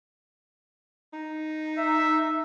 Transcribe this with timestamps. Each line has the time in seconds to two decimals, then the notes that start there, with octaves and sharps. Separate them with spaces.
1.13 D#4
1.78 E5